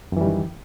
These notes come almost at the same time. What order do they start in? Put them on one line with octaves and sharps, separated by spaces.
F#2 E3 G3 D#3